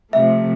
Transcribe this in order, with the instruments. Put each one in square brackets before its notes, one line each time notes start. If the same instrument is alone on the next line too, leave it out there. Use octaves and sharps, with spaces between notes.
[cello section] C3 F3 A3 [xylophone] E5